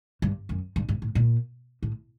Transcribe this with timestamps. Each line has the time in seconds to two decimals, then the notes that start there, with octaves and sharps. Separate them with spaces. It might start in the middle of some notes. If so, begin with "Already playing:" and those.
0.22 G2
0.49 F#2
0.76 G2
0.89 G#2
1.02 A2
1.15 A#2
1.82 A2